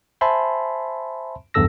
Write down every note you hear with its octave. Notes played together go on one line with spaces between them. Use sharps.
C5 E5 G#5 A5 B5 C6
B1 E2 G2 A4 E6 A#6